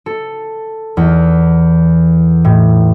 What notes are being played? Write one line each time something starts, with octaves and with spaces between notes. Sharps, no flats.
A4
E2
A2